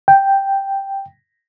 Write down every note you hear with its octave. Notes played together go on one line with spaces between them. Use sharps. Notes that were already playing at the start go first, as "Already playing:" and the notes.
G5